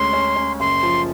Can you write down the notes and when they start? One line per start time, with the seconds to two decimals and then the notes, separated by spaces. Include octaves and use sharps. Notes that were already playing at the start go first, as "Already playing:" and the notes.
Already playing: D2 G#3 C#4 C6
0.13 C#4
0.36 C#4
0.60 F#1 C6
0.83 F3